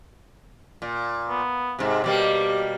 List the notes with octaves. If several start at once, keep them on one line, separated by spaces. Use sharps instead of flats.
A#2
B3
G#2 C3
B2 G3 A#3 G4